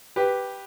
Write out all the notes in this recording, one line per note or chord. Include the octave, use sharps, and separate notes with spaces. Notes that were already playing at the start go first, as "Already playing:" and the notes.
G4 B4